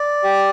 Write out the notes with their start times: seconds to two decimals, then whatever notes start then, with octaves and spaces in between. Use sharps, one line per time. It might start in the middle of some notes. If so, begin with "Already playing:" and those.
Already playing: D5
0.24 G4